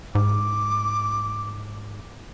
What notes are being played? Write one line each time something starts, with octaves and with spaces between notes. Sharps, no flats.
G#2 D6